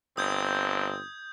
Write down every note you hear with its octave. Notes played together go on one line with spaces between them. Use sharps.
G1 C4 D#6 G6 G#6